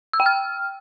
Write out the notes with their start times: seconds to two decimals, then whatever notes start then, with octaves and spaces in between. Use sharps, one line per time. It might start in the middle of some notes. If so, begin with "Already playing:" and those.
0.13 E6
0.20 G5
0.26 F6